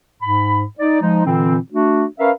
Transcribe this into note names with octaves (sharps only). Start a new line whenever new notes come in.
G#2 B5
D#4 D5
F3 G#3 D#4
A#2 D3 E3 C4
A3 D4 F#4
C#4 A#4 B4 E5 F5